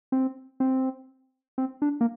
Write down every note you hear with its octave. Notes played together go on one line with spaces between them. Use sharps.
C4
C4
C4
D4
A#3